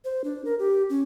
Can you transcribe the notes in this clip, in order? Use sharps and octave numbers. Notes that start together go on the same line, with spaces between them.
C5
D4
A#4
G4
C#4